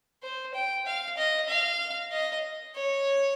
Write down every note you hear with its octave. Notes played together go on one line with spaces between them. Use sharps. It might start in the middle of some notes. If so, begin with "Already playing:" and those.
C5
G5
F5
D#5
F5
D#5
C#5